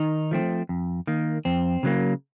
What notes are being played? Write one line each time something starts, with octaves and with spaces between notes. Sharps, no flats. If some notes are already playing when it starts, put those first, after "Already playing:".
Already playing: D#3 D#4
F3 A3 C4
F2
D#3 A#3
F2 C4
C#3 F#3 A#3